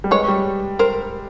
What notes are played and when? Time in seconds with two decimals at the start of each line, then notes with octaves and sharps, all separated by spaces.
0.04 G3
0.11 G#3 B4 C#5
0.28 G3
0.79 A#4 C5